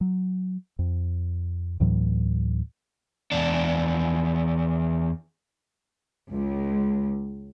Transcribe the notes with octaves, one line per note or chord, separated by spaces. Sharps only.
F#3
F2
D2 A2 E3 F#3
E2 D4
C#2